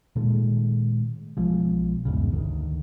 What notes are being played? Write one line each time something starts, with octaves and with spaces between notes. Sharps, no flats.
A#2 D#3 G#3 A3
B1 F3 G#3
G#1 E2 G#2 C#3
D2 D#3